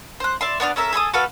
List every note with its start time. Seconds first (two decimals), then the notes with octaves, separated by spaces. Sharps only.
0.20 C5 F#6
0.41 D5 E5 C6
0.60 B3 D4 C#6 F6
0.76 C#4 A4 A#4 E5
0.93 G#4 A4 C6 D#6
1.14 F#4 A4 B4 F5